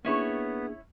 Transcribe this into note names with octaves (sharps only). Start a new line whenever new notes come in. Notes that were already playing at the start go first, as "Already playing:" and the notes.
A#3 B3 C#4 D4 E4 G#4 C#5